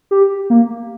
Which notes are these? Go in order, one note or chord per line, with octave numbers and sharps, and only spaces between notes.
G4
A#3